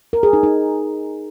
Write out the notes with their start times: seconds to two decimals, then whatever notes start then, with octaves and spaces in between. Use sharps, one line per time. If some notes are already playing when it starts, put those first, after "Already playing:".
0.13 A#4
0.23 G#4
0.33 D#4
0.43 D#4